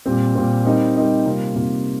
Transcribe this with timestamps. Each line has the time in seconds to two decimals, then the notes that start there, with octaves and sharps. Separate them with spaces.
0.06 A#2 G3 C4
0.35 A#2 G3 C4
0.65 G3 C4 D#4 A#4 D#5
0.95 G3 C4 D#4 A#4 D#5
1.25 C3 G3 A#3 F4 A#4
1.55 C3 G3 A#3 F4 A#4